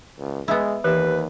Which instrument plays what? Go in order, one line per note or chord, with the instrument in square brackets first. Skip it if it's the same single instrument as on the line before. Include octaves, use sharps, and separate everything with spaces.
[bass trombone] C#2
[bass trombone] G#3 [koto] B3 E4
[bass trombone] D#2 [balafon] E3 G4 E5 [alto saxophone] B4